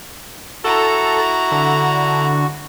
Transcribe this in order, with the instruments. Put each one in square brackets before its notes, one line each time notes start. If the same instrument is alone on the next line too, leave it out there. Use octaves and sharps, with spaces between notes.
[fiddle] E4 A#5 [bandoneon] F#4 [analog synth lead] A4
[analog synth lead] D3